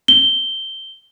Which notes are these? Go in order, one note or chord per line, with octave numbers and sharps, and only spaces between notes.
G7